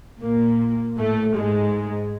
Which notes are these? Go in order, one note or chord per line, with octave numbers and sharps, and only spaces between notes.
A#2 A#3
A2 A3
G#2 G#3